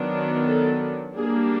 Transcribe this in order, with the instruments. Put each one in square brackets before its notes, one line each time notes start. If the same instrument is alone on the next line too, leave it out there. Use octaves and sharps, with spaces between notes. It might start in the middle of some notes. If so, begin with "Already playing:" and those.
Already playing: [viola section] D#3 F#3 B3 D4
A4
G3 A#3 D4 G#4